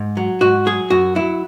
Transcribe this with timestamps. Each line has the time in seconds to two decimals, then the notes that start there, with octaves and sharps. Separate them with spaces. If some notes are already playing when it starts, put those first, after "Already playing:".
Already playing: G#2
0.17 F#3
0.41 G#2 F#4
0.66 F#3 G#4
0.90 F#2 F#4
1.15 F#3 E4